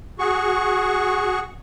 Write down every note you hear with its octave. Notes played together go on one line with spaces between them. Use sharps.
F#4 G#4 C#6